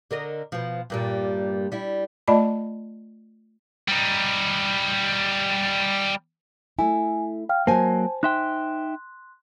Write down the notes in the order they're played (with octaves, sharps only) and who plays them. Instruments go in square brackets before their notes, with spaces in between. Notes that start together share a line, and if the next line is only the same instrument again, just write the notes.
[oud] D3 A#4 D#5
B2 F3
G2 A#2 G3
G3 E4
[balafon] A3 F4 D5 D#5 A5 B5
[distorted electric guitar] G3 D#4
[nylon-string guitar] A3 E4 [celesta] G#5
[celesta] F5 G5 F6
[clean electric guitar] F#3 A#3 [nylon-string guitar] C5 G#5 [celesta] A5
[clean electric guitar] D#4 E5 G5 [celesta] C6 F#6